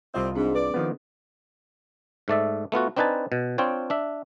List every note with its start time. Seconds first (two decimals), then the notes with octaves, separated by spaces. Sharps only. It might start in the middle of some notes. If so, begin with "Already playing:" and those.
0.14 C2 G3 C4 F4 D#5
0.35 G#2 C4 D4 G#4
0.55 B4 D5
0.74 D#3 F3 B3
2.28 G#2 A3 D5 E5
2.72 A3 B3 F4 F#4
2.97 C4 D4 D#4 B4 G#5 A5
3.32 B2
3.58 C4 D4 F4 C#5 G5
3.90 D4 E5